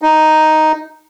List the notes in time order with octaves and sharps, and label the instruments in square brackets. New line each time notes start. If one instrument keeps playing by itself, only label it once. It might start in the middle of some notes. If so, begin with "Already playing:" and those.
[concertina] D#4